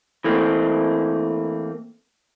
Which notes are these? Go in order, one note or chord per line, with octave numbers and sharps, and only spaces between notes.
E3 A3 A#3 C4